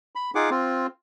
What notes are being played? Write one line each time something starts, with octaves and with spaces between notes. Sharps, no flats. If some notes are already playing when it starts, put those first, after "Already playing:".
B5
D#4 F4 G#4 F#5 D6
C4 F4